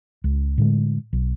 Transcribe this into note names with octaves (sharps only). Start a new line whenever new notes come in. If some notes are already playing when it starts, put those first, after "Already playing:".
C#2
A2 D3 G#3
B1